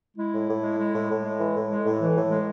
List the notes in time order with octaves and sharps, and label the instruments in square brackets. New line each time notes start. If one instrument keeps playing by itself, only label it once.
[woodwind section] G#3 E4
A2
A2
G#3
G#3
A2
A2
G#3
E3
A2
G#3
A2
E3
A2
G#3